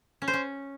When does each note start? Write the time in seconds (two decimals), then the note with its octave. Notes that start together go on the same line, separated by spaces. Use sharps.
0.22 C#4
0.28 C5
0.33 C#4